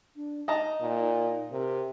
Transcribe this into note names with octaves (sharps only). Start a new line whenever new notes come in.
D4
D#4 D#5 A5 A#5
A#2
C3 A#4